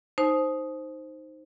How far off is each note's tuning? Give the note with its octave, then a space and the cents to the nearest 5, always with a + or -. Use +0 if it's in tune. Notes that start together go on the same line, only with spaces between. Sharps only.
D#4 +0 C5 +0 A5 -45